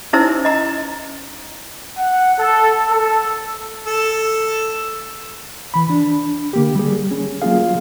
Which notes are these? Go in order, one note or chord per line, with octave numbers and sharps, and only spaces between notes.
C#4 D#4 E4 C5 C#5 E6
D#5 A#5
F#5
A4
A4
A4
E3 B5
D4
D3 A#3 G4
G3 G#4
C#4
F#3 A#3 F4 G#4 F5